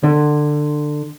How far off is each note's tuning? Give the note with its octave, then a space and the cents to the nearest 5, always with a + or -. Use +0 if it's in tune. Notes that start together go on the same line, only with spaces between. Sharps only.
D3 +20